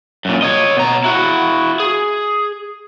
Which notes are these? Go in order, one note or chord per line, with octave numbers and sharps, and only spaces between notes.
F#2 A#2
C#5 D#5
B2 A#5
E4 F#4
G#4